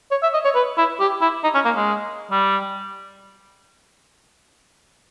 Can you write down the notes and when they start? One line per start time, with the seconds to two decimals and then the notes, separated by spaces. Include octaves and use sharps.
0.11 C#5
0.23 E5
0.34 D#5
0.45 C#5
0.55 B4
0.77 E4
1.00 G4
1.21 E4
1.44 D#4
1.54 C#4
1.65 A#3
1.76 G#3
2.31 G3